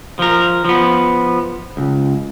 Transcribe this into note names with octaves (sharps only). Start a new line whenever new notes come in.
F3 A#4
F3 B3
C#2